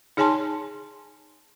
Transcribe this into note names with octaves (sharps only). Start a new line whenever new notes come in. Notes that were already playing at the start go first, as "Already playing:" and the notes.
D#4 G#4 C#5 G#5 A5 C6